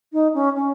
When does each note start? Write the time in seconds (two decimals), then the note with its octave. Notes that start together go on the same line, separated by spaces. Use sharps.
0.13 D#4
0.34 C#4
0.56 C#4